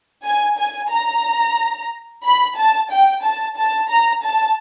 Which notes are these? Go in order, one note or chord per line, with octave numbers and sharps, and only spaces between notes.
G#5
G#5
A#5
B5
A5
G5
A5
A5
A#5
A5